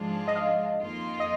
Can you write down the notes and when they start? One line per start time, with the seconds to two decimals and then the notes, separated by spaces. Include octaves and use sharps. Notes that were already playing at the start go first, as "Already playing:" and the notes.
Already playing: G#2 F3 G#3 D4 F4
0.28 D#5
0.35 F5
0.80 F2 D#3 A#3 F4
1.20 D#5